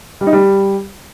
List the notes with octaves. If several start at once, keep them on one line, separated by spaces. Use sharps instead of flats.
G3
D#4
G3